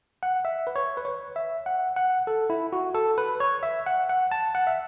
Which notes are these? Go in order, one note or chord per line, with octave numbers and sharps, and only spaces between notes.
F#5
E5
B4
C#5
B4
C#5
E5
F#5
F#5
A4
E4
F#4
A4
B4
C#5
E5
F#5
F#5
A5
F#5
E5